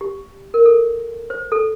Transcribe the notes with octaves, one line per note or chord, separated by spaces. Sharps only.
G4
A#4
A4
C5
A4